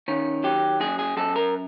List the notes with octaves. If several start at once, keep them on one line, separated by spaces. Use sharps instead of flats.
D#3 C#4
F#3 G4
F#2 G#4
G#4
F#2 A4
A#4